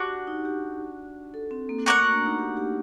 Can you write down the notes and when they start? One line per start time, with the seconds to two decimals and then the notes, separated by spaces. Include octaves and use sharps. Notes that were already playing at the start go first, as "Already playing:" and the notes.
Already playing: D4 F#4 G4
0.27 D#4
0.45 G4
1.34 A4
1.51 C4
1.69 A#3
1.86 A3 F#4 A#4 D5 F#5
2.00 A#3
2.13 D4
2.26 D#4
2.39 G4
2.57 G4